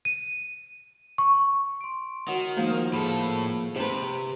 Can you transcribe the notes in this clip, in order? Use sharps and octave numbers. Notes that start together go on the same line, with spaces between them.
D#7
C#6
C6 D7
D#3 F#4 C#5 F#5
D#2 F3 A#3
A2 G#4 A4 B5
C3 G4 B4 C5